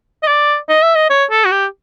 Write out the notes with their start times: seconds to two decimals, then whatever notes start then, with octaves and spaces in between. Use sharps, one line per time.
0.23 D#5
0.27 D5
0.69 D#5
0.83 E5
0.95 D#5
1.10 C#5
1.31 A4
1.45 F#4
1.52 G4